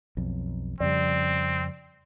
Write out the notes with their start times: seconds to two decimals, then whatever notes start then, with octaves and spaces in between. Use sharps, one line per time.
0.17 B1 F2
0.80 F2 C#3 G3 C4 D5